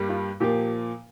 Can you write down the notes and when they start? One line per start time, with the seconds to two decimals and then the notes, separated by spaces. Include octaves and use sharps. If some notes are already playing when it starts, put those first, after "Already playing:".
Already playing: G2 G3 A#3
0.09 F4
0.40 A#2 F3 A#3 G4